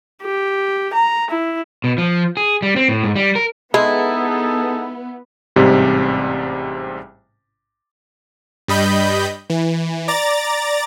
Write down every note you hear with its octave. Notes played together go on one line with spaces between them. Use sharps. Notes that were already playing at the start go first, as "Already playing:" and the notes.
G4
A#5
E4
B2
F3
G#4
G3
C4
A2
G#2
G3
A#4
G#3 B3 D#4 E4 G#4 A4
A1 G#2 C3 G3
G2 G3 D#5 B5 G6
E3
D5 A#5 A6